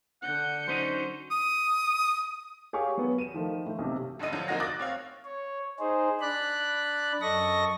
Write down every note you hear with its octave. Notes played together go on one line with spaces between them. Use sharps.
D3 F#5 G6 C#7
F#3 C#4 D#4 C5
D#6
G4 G#4 C#5 F5 G#5 C#6
F#3 B3
D#7 E7
D#3 F3 A3
A2
B1 C3
G#1 G2 D3 D#5 D#7
D3 F3 F#3
C2 F3 A#3 D#4 F#4 A#6
D6 D#6 F#6 A6
C4 C#5 F5
C#5
D#4 G#4 C5
D4 D5 B5 F#6
F#2 A4 D#5 C#6 A#6